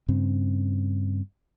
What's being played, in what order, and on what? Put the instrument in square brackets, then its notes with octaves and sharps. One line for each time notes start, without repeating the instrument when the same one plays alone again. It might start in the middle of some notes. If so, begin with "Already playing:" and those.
[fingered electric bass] G2 C#3 C4